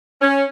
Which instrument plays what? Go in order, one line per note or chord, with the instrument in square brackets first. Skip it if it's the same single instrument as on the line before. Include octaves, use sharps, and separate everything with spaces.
[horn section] C#4